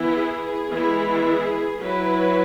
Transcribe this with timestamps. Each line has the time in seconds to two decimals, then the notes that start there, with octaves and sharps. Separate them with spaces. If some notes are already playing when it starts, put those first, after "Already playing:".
Already playing: E3 B3 E4
0.16 G#4
0.71 E3 G#3 B3 E4
1.26 G#4
1.81 F#3 E4 B4